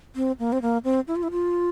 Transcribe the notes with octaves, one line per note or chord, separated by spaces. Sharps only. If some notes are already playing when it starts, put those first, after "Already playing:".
C4
A#3
C4
A#3
C4
E4
F4
E4
F4